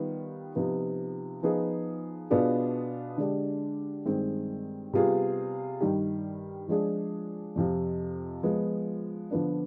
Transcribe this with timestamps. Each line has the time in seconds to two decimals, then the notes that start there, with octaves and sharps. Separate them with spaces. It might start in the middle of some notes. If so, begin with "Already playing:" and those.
Already playing: D#3 G3 B3 F4
0.55 C3 F3 B3 D#4
1.43 F3 B3 D#4 G#4
2.30 B2 B3 D4 F4 G#4
3.17 D3 G#3 D4 G4
4.05 G2 D#3 G#3 C4
4.93 C3 G3 B3 F4 G#4
5.81 G2 D#3 G3
6.68 F3 G#3 D4 G#4
7.56 F2 C3 F3
8.43 F3 G#3 B3
9.31 D3 F3 B3 D4